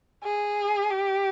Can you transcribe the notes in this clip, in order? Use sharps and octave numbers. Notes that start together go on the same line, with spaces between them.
G#4
G4